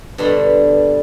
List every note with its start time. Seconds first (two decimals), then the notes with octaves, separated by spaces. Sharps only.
0.18 G2 B2 D3 G3 D4